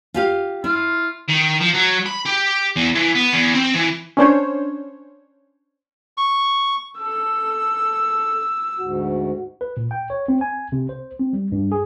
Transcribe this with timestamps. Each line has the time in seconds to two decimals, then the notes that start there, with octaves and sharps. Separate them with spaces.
0.14 F4 G4 F5
0.64 E4 F4
1.29 D#3
1.61 F3
1.74 F#3
2.06 B5
2.26 G4
2.76 E2
2.95 E3
3.15 B3
3.34 E2
3.54 C4
3.75 E3
4.17 C#4 D4 C5 C#5
6.17 C#6
6.99 A4 E6
8.79 D2 G#2 F#4
9.61 B4
9.77 A#2
9.91 G5
10.10 C#5
10.28 C4
10.41 G#5
10.72 C3
10.89 C5
11.19 C4
11.33 G3
11.52 G2
11.72 G#4